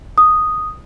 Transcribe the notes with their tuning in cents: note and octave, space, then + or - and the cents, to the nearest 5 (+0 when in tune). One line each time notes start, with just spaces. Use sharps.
D#6 -5